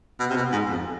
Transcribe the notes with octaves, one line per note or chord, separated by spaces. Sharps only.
B2
C3
B2
G#2
F2